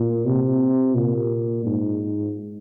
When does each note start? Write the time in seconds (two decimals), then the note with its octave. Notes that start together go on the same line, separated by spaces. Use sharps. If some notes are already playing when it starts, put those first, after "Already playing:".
Already playing: A#2
0.27 C3
0.96 A#2
1.66 G#2